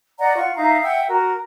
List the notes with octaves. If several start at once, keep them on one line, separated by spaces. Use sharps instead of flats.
D5 D#5 F#5 A#5
F4 F#5 C#6
D#4 E5 F5 A#5
E5 F#5 G5 E6
F#4 A#4